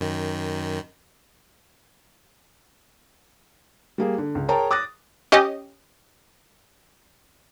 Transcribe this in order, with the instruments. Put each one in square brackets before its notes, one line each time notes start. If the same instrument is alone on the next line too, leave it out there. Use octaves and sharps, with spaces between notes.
[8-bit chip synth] F#2 D#3
[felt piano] G3 A#3 G#4
D3
C#2
G#4 A#4 C#5 G5 A5 A#5
D6 D#6 F#6 A6 A#6
[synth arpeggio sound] C#4 G4 D#5